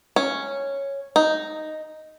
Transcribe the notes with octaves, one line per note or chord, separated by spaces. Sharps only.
C#4
D#4